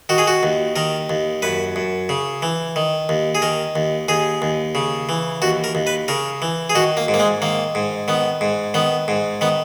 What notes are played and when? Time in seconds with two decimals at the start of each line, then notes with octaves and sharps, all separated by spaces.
0.09 D#3 F#4
0.18 G#4
0.27 F#4
0.43 D#2
0.76 D#3 A#4
1.10 D#2
1.42 F#2 B4
1.76 F#2
2.09 C#3
2.42 E3
2.76 D#3
3.09 D#2
3.35 G#4
3.42 D#3 A#4
3.76 D#2
4.08 D#2 G#4
4.42 D#2
4.75 C#3
5.09 E3
5.42 D#2 F#4
5.64 A#4
5.75 D#2
5.87 B4
6.08 C#3 A#4
6.42 E3
6.70 G#4
6.75 D#3 F#4
6.97 A#3
7.08 G#2
7.14 A#3
7.20 G#3
7.42 D#3 A#3
7.75 G#2
8.08 D#3 B3
8.41 G#2
8.74 D#3 B3
9.08 G#2
9.41 D#3 B3